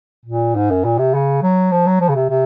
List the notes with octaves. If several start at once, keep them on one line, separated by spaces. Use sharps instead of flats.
A#2
G#2
F#2
A#2
C3
C#3
F#3
F3
F#3
F3
C#3
C3
C3